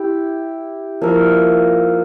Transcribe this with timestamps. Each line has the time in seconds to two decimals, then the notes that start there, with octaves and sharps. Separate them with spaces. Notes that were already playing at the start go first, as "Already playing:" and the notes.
Already playing: E4 G4
1.01 F3 A#3 E4 A#4